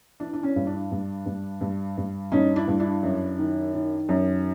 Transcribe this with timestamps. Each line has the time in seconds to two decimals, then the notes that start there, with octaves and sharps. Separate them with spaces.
0.20 E3 D4
0.33 D4
0.43 C#4
0.56 G2
0.67 D4
0.91 G2
1.26 G2
1.61 G2
1.97 G2
2.32 G2 C#4 D#4
2.56 D4 E4
2.68 G2
2.80 D4 E4
3.03 F#2
3.39 D#3
3.74 D#3
4.09 F#2